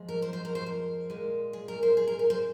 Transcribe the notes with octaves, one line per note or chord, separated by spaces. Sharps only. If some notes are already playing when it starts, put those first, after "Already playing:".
Already playing: F2 F3 G#3
A#4
C5
C5
A#4
C5
A#4
A#2 G#3
G#4
A#4
C5
G#4
A#4
A#4
C5